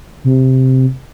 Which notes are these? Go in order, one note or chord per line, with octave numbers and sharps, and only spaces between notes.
C3